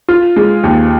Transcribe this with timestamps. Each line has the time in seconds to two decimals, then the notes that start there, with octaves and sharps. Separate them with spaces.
0.08 F4
0.36 G#3
0.64 D#2